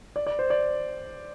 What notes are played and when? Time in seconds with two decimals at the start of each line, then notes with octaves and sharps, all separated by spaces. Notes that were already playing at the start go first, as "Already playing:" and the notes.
0.16 D5
0.27 D5
0.39 C5
0.50 D5